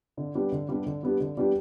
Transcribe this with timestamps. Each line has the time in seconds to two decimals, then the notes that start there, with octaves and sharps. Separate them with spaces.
0.17 D3
0.35 G3 B3 D4 G4
0.52 D3
0.69 G3 B3 D4 G4
0.86 D3
1.03 G3 B3 D4 G4
1.20 D3
1.37 G3 B3 D4 G4